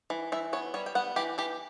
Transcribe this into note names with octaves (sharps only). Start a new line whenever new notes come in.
E3
E3 E5
B3 C#5
G3 C#5
G5
B3 F#5
E3 G4
E3 G4